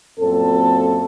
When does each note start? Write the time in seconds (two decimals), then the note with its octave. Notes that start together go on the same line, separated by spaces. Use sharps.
0.19 F#2 A#2 C4 A4